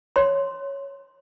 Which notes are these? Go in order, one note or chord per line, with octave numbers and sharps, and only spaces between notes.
C#5 C6